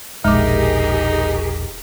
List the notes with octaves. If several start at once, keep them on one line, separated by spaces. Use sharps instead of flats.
E1 A#1 G#3 D#4 G4 G#4 A#4 D6